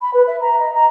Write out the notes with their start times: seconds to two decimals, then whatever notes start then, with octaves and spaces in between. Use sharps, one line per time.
0.01 B5
0.13 B4
0.27 E5
0.41 A#5
0.60 D#5
0.74 A#5